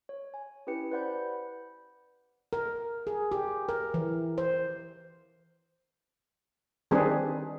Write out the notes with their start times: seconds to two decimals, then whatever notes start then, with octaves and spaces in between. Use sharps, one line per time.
0.09 C#5
0.34 G#5
0.67 C#4 E4 G4 B4 G5 C#7
0.91 B4 C5 D5 F#5 B5 G6
2.53 A#4
3.07 G#4
3.32 G4
3.69 A#4
3.94 E3
4.38 C5
6.91 D#3 G3 C4 D4 G#4 B4